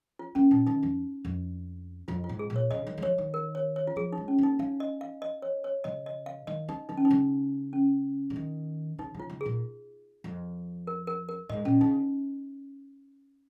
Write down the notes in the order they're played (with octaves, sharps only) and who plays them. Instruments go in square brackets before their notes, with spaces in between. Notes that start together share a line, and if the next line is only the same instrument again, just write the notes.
[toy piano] F4
[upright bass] A#3 [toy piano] C#4
[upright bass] A#2 [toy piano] D#4
[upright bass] D#3 [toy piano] D#4
[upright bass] F2
F2
[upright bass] F2 [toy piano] F4
[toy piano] F4
[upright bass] G#2
[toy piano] G#4
[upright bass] A#2
[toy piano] C#5
[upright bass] C#3 [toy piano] D#5
[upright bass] D#3
G#3
[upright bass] F3 [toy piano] C#5
[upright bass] D#3
[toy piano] A#4
C#5
C#5
F4
[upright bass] F3 [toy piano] G#4
[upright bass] G#3 [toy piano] D#4
[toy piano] C#4
[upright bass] A#3 [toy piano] D#4
[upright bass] C#4 [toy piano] F5
[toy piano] D#5
F5
D#5
C#5
C#5
[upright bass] C#3 [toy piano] D#5
[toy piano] D#5
F5
[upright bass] D#3 [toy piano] D#5
[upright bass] C#4 [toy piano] D#4
[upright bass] D#3 [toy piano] D#4
[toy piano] C#4
D#4
[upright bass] C#3
[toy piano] C#4
[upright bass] C#3
D#3
[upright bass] C#3 [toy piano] D#4
[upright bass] C#3
[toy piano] F4
[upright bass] C#3
[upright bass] A#2 [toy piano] G#4
[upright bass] F2
[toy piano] A#4
A#4
A#4
[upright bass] G#2 [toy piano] D#5
[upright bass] A#2 [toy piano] C#4
[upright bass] C#3 [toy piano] D#4